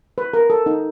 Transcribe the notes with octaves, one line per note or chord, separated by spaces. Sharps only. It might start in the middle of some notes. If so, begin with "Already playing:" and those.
B4
A#4
A4
D#4